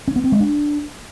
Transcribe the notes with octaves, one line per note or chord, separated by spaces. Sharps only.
C#4
B3
C4
G#3
D4